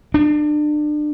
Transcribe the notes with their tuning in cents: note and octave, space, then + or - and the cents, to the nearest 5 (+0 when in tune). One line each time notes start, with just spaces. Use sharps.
D4 +30